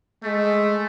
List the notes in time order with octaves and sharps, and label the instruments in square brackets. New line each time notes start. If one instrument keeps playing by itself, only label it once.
[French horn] G#3 [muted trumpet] A3